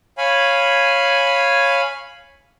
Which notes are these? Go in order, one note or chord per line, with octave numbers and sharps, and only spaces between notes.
C#5 F5 G#5 B5